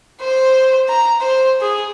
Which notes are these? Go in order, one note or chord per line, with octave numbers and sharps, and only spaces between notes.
C5
A#5
C5
G#4